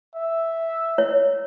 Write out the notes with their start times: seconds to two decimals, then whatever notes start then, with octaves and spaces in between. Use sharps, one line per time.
0.15 E5
0.98 E4 C#5